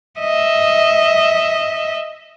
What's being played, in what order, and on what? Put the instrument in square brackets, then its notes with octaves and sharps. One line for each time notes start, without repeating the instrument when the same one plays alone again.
[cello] D#5 E5